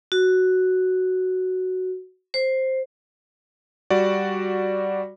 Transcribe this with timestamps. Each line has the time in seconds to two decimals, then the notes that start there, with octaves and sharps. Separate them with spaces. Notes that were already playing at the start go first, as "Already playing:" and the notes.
0.12 F#4
2.34 C5
3.90 G3 F#4 D5